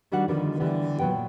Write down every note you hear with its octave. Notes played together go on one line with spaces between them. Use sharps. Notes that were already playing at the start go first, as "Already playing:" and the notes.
D#3 G3 D4 F#4 F#5
D3 D#3 F3 G3 B3
D3 E3 G3 B3
A#2 F#3 B3 B4 G5